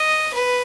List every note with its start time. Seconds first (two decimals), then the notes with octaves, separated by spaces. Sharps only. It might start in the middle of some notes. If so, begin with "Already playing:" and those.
Already playing: D#5
0.34 B4